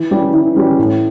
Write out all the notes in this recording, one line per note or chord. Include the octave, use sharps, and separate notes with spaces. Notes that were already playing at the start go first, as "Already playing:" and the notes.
Already playing: E3
G3 C#4 G4
E3
G3 C#4 G4
A2